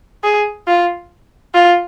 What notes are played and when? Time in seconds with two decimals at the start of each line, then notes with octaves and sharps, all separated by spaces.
0.23 G#4
0.68 F4
1.55 F4